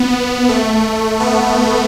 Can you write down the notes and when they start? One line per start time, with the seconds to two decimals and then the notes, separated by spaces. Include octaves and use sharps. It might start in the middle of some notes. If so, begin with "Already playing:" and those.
Already playing: B3
0.49 A3
1.20 B3